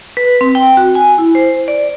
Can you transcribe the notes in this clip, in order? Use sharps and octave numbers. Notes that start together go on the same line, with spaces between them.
B4
C4
G5
F#4
G#5
E4
C5
D5